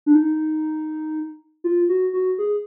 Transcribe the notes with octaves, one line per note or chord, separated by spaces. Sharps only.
D4
D#4
F4
F#4
F#4
G#4